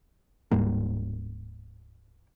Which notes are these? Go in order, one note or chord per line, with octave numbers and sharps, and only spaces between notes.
D1 G#2 G3 A#3